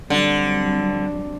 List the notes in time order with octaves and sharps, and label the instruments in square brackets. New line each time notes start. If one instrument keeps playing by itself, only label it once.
[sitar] D3 [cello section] F#3 G3 C4